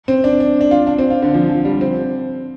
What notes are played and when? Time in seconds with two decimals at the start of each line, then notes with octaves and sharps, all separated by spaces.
0.08 C4
0.24 D4
0.40 D4
0.61 D4
0.71 F4
0.87 D4
0.98 C4
1.10 F4
1.22 D3
1.34 F3
1.49 F3
1.65 G3
1.81 C4